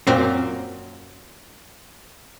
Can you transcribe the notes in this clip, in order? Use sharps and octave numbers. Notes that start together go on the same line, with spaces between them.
F#2 A#2 A#3 C4